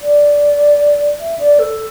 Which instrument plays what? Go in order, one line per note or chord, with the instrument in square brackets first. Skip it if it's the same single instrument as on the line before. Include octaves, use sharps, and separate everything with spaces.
[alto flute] D5
E5
D5
A4